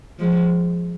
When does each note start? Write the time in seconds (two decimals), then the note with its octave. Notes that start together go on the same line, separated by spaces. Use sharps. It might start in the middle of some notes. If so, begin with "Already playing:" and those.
0.19 F3 G#3